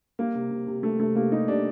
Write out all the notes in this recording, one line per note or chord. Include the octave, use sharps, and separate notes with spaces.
G3 A#3
C3
C3
C3
G3 A3
C3 A3
C3 A#3
G3 D#4
C3 D4